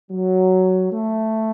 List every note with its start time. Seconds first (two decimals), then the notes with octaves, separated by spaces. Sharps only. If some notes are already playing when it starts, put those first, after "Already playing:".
0.11 F#3
0.91 A3